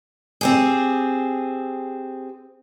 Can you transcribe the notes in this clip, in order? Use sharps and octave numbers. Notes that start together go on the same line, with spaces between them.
C4 G4 G#4